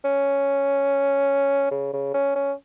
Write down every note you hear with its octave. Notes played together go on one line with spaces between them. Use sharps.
C#4
C#3
C#3
C#4
C#4